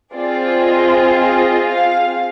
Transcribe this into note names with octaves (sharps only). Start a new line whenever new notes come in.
C4 F4 G#4 D5
D#5
D#5
F5